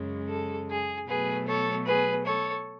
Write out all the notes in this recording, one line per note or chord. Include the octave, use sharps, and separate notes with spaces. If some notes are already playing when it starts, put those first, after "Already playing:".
Already playing: F#2 C#3 G#3
A4
G#4
B2 F#3 A3 G#4 B4
A4 C#5
G#4 B4
A4 C#5